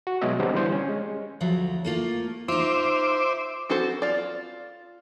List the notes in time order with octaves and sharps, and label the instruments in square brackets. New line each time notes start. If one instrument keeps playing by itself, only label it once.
[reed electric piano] F#4
B2 F#3 G#3 B3 D#5 E5
D3 G3 B3 C4 G4 C5
E3 G3 C5
C#4
G#3
[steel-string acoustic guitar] D2 F3 F#3
A3 A#3 F4
[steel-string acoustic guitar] D#4 F4 [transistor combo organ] C5 E5 D6
[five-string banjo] C4 F#4 A4 C5
F4 D5